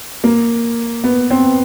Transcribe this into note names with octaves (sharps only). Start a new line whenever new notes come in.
A#3
B3
C4